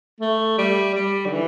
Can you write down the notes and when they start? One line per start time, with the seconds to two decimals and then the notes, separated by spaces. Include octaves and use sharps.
0.21 A3
0.58 G3
0.95 G3
1.26 D3
1.32 E3